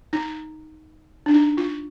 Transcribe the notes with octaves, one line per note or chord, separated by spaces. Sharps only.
D#4
D4
D#4
F4